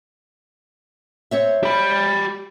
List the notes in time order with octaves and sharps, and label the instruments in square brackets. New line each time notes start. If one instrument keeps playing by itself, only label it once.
[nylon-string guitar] C4 C#5 E5
[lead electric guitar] G4 B5